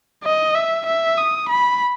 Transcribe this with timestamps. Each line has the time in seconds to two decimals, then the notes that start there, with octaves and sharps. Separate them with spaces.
0.24 D#5
0.55 E5
0.86 E5
1.17 D#6
1.49 B5